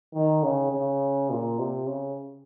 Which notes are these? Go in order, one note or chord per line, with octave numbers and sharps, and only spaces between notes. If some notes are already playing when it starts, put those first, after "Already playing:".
D#3
C#3
C#3
A#2
C3
C#3